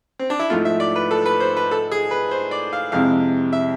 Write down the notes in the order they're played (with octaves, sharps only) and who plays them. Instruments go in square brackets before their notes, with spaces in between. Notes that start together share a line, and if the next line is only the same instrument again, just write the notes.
[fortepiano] C4
D4
E4
[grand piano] G#2 F3 A3 E4 [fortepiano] F4
[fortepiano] E5
D5
B4
A4
B4
C5
B4
A4
G#4
B4
C5
D5
F5
[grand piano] F2 C3 G#3 C4 E4 [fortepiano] F5
[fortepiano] E5